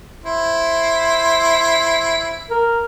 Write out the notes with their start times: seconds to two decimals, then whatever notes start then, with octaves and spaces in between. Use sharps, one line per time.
0.24 E4 C5
2.50 A#4